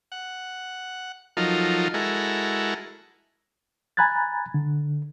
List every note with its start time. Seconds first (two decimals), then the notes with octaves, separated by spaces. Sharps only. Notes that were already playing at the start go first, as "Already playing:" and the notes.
0.12 F#5
1.37 F3 F#3 D#4 F4 A4 A#4
1.94 G#3 E4 F#4 A4 A#4
3.97 G#5 A#5 B5 F#6 G#6 A6
4.54 D3